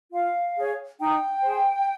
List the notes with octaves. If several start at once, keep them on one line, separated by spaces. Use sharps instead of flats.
F4 F5
G#4 C#5
D#4 G5
G#4 C5